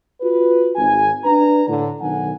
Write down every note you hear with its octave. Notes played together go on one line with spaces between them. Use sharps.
F4 F#4 B4
G#1 G#5
D4 B4 A#5
A2 D3
B1 D#3 F#5 G#5